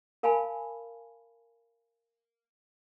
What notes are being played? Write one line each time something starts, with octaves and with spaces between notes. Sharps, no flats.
A#4 F5 G#5 A5 B5